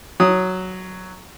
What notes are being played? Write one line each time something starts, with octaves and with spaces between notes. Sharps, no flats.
F#3 D#6